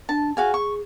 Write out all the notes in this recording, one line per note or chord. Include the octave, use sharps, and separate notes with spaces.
D4 A5
F#4 G#4 F5 G#5
C#6